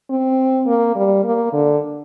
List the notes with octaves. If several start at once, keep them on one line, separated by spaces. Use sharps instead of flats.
C4
A#3
G3
A#3
D3